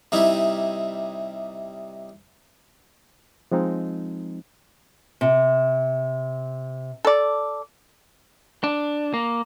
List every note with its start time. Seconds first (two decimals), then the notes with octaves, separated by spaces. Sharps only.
0.12 C3 G3 D#4 E4
3.52 F3 G#3 C4 D#4
5.21 C3
7.05 A4 D5
8.64 D4
9.14 A#3